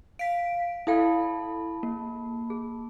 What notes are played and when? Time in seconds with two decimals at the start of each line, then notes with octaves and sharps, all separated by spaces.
0.19 F5 B6 D7
0.87 E4 A4 E5 F5 G5 A5 B5
1.83 A#3
2.50 G#4